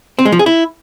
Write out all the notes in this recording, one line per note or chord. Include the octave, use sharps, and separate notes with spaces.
C4
G#3
F3
G#4
E4